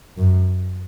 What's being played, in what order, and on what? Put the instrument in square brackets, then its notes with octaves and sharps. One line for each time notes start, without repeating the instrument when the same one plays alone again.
[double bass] F#2